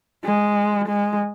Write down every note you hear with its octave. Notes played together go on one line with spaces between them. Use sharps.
G#3
G#3